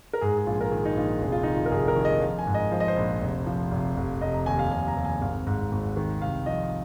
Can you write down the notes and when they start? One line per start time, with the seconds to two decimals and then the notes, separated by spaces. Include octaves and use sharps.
0.13 A#4
0.21 G#2 G#4
0.38 G#4
0.46 A#1 F4
0.61 A#4
0.71 D#3 G#4
0.85 D#4
0.96 A#1 F4
1.21 F1 G#4
1.32 F4
1.43 D#3 D#4
1.55 F4
1.66 A#4
1.71 F1 G#4
1.88 A#4
1.96 D#3
2.05 D#5
2.21 F3 F5
2.39 G#5
2.47 G#2
2.54 D#5
2.71 F3 C5
2.80 D#5
2.88 C5
2.97 A#1
3.21 F1
3.46 F3
3.71 F1
3.97 F1
4.21 F1 D#5
4.34 A#5
4.46 D#2 G#5
4.59 F5
4.71 F1 G#5
4.88 A#5
4.97 D#2
5.05 G#5
5.21 G#1 F5
5.47 G#2
5.71 G#1
5.96 D#3
6.21 C2 F5
6.46 F3 D#5